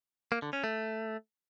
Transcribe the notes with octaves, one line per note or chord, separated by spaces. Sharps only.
A#3
D3
C#4
A3